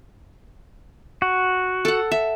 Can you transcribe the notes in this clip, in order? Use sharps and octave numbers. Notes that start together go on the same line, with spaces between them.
F#4
A4 F#5
E5